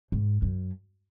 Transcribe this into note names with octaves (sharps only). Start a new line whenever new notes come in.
G#2
F#2